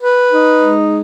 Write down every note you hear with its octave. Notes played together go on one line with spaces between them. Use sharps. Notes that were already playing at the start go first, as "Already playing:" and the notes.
B4
D#4
G#3